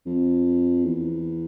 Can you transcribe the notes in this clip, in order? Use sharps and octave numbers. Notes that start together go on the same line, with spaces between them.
F2
E2